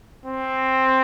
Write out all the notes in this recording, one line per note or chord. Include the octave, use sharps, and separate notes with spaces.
C4